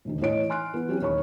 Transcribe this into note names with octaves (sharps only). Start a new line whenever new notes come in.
E1 D2 D#3
A2 E3 C#5 D#5 D7
G#5 C6 F6 F#6 D7
E3 B3
F#3 C4 C#4 E4 G4
D#1 D#4 C#5 B5 C#6